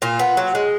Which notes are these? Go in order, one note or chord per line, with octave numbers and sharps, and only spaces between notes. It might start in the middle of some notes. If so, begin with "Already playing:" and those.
A#2 F4
B3
F#3
G#3